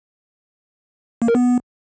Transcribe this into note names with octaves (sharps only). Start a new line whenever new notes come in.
A#3
A#4
B3